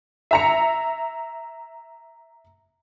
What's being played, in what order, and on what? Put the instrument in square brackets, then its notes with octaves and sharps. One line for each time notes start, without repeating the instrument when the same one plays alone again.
[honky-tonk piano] E5 A#5 C#7